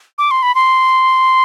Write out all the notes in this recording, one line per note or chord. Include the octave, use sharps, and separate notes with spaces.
D6
C6
B5
C6